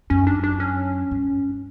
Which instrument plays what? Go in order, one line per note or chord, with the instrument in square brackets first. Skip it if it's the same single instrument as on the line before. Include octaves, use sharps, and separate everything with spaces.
[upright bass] F#2 [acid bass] C#4
[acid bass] D4
D4
C#4
[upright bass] G2